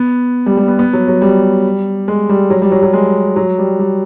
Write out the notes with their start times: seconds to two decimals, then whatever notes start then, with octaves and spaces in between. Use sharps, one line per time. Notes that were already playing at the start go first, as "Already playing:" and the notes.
Already playing: B3
0.46 G3
0.57 G3
0.68 B3
0.79 B3
0.93 F#3
1.08 F#3
1.22 G3
2.08 G#3
2.29 G3
2.50 F#3
2.62 G3
2.72 F#3
2.82 F#3
2.93 G#3
3.36 F#3
3.58 G3
3.79 G3